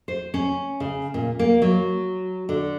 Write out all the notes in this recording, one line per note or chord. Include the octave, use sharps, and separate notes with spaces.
C5
C#4
C#3
A#2
A#3
F#3
D3